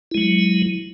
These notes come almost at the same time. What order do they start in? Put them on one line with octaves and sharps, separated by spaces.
E4 G#3 F#3